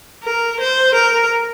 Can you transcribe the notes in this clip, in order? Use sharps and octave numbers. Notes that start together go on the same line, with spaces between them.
A#4
C5
A#4